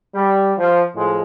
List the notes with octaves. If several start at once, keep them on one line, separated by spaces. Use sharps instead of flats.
G3
F3
A2 F3 G#3